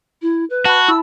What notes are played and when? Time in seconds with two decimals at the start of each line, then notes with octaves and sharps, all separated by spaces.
0.22 E4
0.50 B4
0.65 F#4 A5 B5
0.88 E4 E6